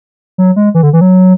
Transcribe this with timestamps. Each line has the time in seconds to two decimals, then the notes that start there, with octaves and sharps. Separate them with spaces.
0.38 F#3
0.56 G#3
0.75 E3
0.83 D3
0.93 E3
1.01 F#3